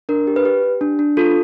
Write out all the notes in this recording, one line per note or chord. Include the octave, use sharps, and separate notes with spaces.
D4 A#4
G4
B4
G4
G4
D4
D4
F4 A4